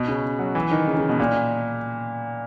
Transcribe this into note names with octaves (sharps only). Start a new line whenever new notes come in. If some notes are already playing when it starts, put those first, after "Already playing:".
Already playing: B2
C#3
F#3
E3
D#3
C#3
C#3
B2
A#2